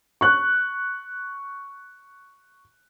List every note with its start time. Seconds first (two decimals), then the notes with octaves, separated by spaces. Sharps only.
0.21 C#6 F#6